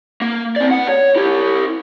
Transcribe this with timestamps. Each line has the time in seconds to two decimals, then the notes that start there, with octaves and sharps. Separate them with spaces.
0.22 A#3
0.56 C4 D5
0.71 B3 F#5
0.89 C#5
1.16 E4 G4